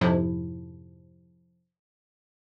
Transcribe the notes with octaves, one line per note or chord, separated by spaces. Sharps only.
F2 G#2 C3 F3 E4